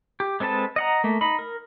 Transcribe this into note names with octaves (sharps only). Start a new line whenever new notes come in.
G4
G#3 C4 A4 B4 A5
D#5 F#5 A#5
A3 A#3
D#4 B5
A#4